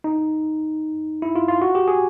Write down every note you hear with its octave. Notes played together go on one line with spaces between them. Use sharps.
D#4
E4
F4
F4
F#4
G4
G#4